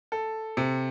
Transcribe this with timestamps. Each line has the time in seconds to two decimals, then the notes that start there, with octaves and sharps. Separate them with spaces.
0.12 A4
0.57 C3